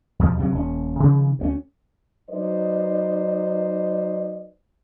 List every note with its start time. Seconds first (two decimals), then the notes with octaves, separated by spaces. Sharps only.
0.19 E2 B2 F3
0.38 G2 C3 E3 F#3
0.52 D#1 C#4
1.00 C3 D#3 F3
1.39 D2 A#3 C#4
2.30 F#3 D#4 B4 C5 D5 D#5